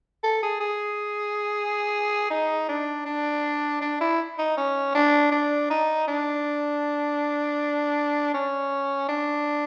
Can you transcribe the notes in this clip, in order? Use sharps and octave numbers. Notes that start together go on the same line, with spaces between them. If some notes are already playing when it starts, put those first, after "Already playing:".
A4
G#4
G#4
D#4
D4
D4
D4
E4
D#4
C#4
D4
D4
D#4
D4
C#4
D4